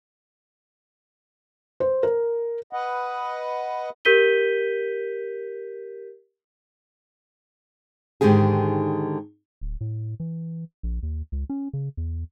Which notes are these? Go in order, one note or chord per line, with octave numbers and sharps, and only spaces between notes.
C5
A#4
B4 D#5 F#5
G4 A#4 G6 B6 D#7 G7
G#2 D3 D#3 G4 G#4
D1
A2
E3
A#1
D#2
C#2
C#4
C#3
E2